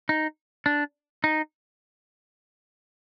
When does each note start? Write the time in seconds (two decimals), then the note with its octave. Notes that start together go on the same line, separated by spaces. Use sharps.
0.09 D#4
0.66 D4
1.24 D#4